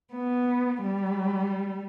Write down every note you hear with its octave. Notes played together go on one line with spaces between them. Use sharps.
B3
G3